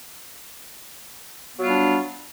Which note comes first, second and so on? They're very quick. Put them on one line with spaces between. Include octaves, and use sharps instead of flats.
B3 F#3 F4 G3 D4